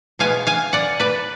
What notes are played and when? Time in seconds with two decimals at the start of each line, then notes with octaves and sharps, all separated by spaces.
0.19 B2 G#3 B3 F5 G#5
0.47 F5 G#5
0.73 D5 F#5
1.00 B4 D5